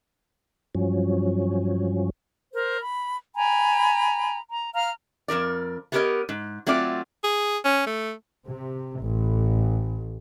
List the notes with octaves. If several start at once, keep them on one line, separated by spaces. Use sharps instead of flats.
G2 F3 F#3 C#4
A#4 C5
B5
G5 G#5 A#5 B5
A#5
F5 A#5 F6
F2 C#3 A#4 D5
A3 B3 G4 A#4 C#5 D#5
G#2
F#3 A3 C4 F4 D5
G#4
C#4
A3
C3
A1